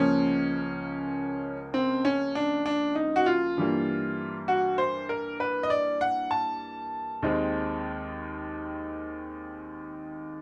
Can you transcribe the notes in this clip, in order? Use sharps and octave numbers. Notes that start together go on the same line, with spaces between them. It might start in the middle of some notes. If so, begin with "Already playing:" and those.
Already playing: C#2 C#3 F3 A#3 C#4
C4
C#4
D4
D4
D#4
F#4
F4
G2 E3 G3 A#3
F#4
C5
A#4
B4
D#5
D5
F#5
A5
D#2 D#3 G#3 C4